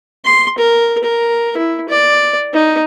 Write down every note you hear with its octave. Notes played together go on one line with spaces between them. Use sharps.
C6
A#4
A#4
E4
D5
D#4